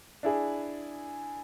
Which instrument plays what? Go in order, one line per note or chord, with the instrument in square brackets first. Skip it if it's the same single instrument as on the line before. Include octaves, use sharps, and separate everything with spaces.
[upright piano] D4 E4 G#4